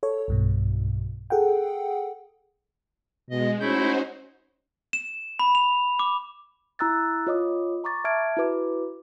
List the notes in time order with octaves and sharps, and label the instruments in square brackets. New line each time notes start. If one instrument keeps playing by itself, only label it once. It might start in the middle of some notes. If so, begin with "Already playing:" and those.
[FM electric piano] A4 C#5
B1 G2 B2
G#4 A4 F#5 G5
[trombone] B2 [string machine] G#3 [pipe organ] D#5
[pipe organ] A3 E4 G6 [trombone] C#4 [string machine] D#4 F#4 C5
[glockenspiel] E7
B5
F7
D6
[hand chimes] E4 A#5 E6 F#6 A6
F4 C#5 D#5 D6 D#6
A#5 C#6 D6 A6
E5 A5 F6 G#6 D7
E4 F#4 B4 D6